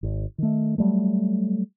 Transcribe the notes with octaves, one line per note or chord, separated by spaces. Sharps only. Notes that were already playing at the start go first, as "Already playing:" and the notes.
G#1
D#3 A3
F#3 G3 A3